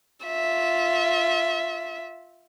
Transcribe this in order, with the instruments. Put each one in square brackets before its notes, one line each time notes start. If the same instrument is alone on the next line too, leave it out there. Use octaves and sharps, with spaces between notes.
[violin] F4 E5